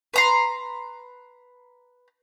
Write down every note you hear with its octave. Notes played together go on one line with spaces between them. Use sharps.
B4 A#5 C6